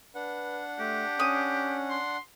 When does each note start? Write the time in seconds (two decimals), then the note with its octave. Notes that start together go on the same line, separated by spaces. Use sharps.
0.15 D4 B4 F#5
0.79 A3 G4
1.19 C#4 D#6
1.90 C6